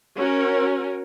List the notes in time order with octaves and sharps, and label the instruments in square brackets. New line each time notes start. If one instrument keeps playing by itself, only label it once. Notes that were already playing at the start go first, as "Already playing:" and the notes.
[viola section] C#4 F#4 A#4